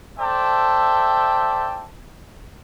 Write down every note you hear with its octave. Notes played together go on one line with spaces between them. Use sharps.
A4 C5 D5 E5 G5 A5